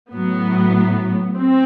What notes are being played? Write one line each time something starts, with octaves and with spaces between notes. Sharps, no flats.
A2 F#3 B3
C4